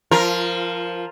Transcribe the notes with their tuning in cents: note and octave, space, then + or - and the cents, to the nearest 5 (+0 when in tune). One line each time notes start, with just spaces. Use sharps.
F3 +0 F4 -25 A#4 +0